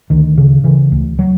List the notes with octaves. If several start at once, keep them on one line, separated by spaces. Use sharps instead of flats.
D2 D#3
C#3
C#3 E3
D2
F#3